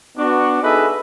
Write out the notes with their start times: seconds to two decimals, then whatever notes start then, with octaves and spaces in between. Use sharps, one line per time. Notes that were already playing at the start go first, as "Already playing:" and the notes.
0.18 B3 D4 F#4
0.62 D#4 G#4 A4 B4 D#5 E5